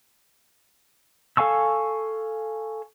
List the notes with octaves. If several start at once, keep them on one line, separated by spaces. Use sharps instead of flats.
A4 F5 G#5 C#6 E6